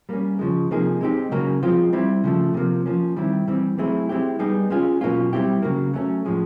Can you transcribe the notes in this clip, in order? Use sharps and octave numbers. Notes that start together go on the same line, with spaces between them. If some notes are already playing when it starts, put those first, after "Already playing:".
G3 A#3 C#4
C#3 F3 G#3
C3 F3 A#3 D#4 G#4
G#3 C4 D#4 G4
C#3 F#3 A#3 C#4
F3 G#3 C4 F4
G3 C4 E4
C#3 F3 A3
C3 F3 A#3
F3 A#3 C#4
D#3 G3 C4 E4
E3 G3 C4
F#3 A3 C4 E4 G#4
G#3 C4 E4 G4
G3 B3 D#4 G#4
G#3 C#4 F4 G#4
B2 F#3 A#3 C#4 F4
G3 C4 E4 G4
C#3 F#3 A#3
F#3 A3 C#4
A2 F3 G#3 C#4